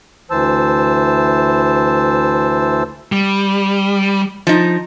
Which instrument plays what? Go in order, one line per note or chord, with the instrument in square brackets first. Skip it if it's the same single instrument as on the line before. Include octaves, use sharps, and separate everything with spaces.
[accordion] D2 E3 C5 A5 E6
[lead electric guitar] G3
[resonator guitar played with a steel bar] F3 D#4